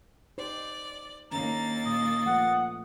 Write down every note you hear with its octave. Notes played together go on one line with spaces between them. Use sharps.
D#4 G4 C5 D5
D#2 D#3 A#3 C#4 D4 A#5 A6
A#2 D#6
F3 A3 B3 F#5